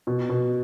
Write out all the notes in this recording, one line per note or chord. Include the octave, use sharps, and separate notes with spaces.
B2
B2